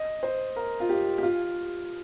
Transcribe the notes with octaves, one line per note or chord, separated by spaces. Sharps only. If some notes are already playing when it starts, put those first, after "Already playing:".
Already playing: D#5
C5
A#4
F4
G4
G4
F4